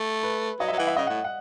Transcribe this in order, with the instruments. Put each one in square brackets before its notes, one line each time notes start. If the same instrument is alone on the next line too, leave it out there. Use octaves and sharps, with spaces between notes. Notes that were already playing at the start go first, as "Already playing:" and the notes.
Already playing: [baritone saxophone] A3
[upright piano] B4
[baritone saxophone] F#3 [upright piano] D#5
[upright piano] E5
[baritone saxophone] F#3
[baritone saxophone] E3 [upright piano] F#5
[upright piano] E5
[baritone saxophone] C#3 [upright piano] D#5
[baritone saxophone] A2 [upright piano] F#5
[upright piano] F#5